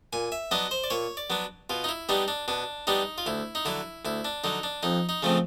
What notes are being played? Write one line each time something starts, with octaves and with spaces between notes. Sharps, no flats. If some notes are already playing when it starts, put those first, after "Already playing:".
A#2 G#5
E5
F#3 B3 D4 D#5
C5
D5
A#2 C#5
D5
F#3 B3 D4
B2 F4
D#4
E4
G3 B3 D4 D#4
D4
B2 D4
G3 B3 D4 D#4
F4
D2 E4
D#4
D3 F#3 E4
D2 E4
D4
D3 F#3 D#4
D4
F2 D#4
D#4
C#3 F3 A3 C4